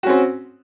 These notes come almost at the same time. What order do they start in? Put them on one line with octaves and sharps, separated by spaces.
F#4 C#4 C4